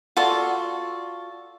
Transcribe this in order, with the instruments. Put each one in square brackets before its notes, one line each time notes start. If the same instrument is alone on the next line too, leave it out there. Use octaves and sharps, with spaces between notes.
[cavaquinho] F4 F#4 A4 D5